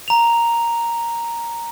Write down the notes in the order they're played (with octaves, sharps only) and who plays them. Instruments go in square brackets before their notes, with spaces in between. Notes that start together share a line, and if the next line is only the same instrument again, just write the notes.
[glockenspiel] A#5 F7